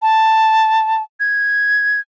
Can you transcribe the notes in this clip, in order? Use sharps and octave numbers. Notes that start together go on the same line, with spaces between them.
A5
G#6